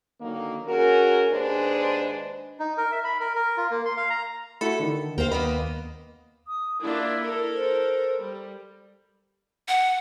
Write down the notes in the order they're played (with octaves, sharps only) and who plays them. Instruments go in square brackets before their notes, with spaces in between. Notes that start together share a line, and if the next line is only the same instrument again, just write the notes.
[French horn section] D3 D#3 F#3 A#3
C#4 F#4 G#4 A#4
D#2 G#2 G#3 D4 B4 C5
[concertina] D#4
A#4
E5
B5
A#4
A#4
F4
A#3
C6
F5
A#5
[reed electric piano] A3 E4 F#4 [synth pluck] A4 B5 C#7
[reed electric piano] D3 D#3
[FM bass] D#2 [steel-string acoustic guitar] A#4 F5 [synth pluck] C5 G5
[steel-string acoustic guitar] A#3 B3 D#5 [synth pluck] B5
[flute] D#6
[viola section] A#3 D4 F4 [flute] E4
[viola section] A4 A#4
[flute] C5
[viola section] G3
[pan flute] F#5